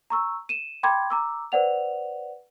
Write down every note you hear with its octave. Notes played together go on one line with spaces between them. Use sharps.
A#5 C#6 E6
D#7 E7
G5 B5 C6 D6 G#6
A#5 D6 E6
B4 C5 D5 F#5 F7